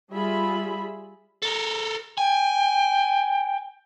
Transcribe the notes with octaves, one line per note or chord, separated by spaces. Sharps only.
G3 F4 G#4 E5 B5
A4 A#4
G5 G#5